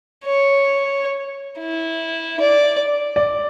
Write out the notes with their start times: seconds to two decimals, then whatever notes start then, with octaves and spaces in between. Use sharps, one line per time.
0.25 C#5
1.60 E4
2.40 D5
3.16 D5